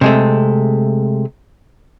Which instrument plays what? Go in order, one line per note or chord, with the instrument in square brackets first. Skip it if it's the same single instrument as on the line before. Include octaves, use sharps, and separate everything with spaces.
[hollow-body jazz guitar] C3 G#3 A3